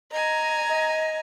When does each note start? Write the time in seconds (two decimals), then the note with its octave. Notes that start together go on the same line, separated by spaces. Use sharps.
0.12 D#5 G#5 A#5
0.68 D#5